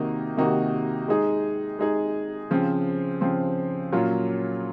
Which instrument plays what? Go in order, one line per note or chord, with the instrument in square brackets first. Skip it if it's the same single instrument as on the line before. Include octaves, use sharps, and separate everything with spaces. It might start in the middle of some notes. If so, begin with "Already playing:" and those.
Already playing: [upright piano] C3 D#3 A#3 D#4 F#4
C3 D#3 A#3 D#4 F#4
G#3 D#4 G#4
G#3 D#4 G#4
C#3 F3 C4
C#3 F3 C4
A#2 F#3 C#4 F4